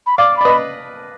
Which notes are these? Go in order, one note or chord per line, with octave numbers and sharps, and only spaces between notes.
B5
D5 F5 D6
D5 B5
B4 D#5